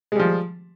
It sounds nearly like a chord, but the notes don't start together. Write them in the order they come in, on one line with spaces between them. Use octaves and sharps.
G#3 G3 F3